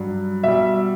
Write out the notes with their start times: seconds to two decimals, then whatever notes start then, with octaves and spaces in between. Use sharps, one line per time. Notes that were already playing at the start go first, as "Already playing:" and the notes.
Already playing: G2 F#3
0.43 B2 G3 E5